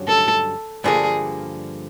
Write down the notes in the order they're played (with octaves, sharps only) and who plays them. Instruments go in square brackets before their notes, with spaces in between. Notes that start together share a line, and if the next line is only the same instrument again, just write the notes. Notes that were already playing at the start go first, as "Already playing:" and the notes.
Already playing: [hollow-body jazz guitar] G2 D3 F#3 C#4
[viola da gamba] A4
[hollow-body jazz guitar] G2 D3 F3 A#3 [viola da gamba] G#4